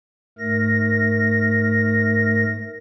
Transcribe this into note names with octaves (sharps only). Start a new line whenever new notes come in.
G#2 A3 A#4 A#6